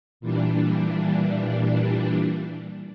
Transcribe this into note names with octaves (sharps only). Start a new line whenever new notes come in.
A#2 E3 G3 D4